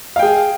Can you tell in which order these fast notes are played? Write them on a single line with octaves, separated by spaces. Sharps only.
F5 G5 G#4